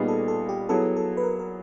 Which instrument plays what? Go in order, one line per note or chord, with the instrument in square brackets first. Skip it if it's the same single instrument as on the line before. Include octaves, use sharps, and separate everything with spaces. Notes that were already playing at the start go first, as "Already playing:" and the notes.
Already playing: [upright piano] A#2 G3 B3 D#4 G#4
[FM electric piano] A4
A4
G4
[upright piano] F#3 B3 E4 G#4 [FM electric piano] A4
[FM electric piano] A4
B4
A#4
A#4